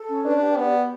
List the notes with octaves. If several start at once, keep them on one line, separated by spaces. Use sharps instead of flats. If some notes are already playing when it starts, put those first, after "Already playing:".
Already playing: A4
C#4
D4 B4
G4
B3 D5
G4